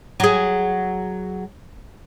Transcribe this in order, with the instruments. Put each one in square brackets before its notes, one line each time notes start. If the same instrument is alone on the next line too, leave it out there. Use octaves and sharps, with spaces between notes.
[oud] F#3 G#4